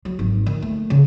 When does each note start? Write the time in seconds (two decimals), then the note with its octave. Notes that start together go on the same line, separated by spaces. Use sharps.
0.05 F#3
0.19 G#1
0.46 D#3
0.62 A3
0.90 C#3